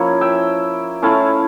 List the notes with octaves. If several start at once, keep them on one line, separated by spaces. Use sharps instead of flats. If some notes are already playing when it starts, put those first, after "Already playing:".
Already playing: F3 A#3 C#4 E4 C#5
E5 G5
A3 C#4 E4 F5 A5